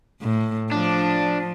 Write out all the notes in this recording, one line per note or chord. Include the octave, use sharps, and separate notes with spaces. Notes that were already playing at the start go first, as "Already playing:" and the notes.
A2
F3 D4